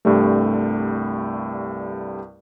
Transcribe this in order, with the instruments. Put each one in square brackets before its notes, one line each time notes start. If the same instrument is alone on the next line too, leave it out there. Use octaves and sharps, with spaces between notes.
[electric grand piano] C2 G2 G3 A3